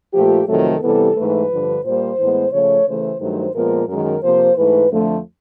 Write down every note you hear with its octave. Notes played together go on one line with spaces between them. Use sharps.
A#2 F3 A3 G4
F2 C3 D#3 F#3 A3 A4
C3 E3 G3 B3 A4
G#2 E3 A3 B4
G2 D3 F3
A#2 G3 A#3 C5
A2 E3 G#3 B3
C#3 F3 A3 C#5
C#3 E3 A3 C5
G2 D#3 F#3 A3 C5
A#2 F3 G#3 B3 A#4
F#2 D#3 G#3 A#4
C3 F3 A#3 C5
G#2 E3 A3 B4
F2 D3 F3 A3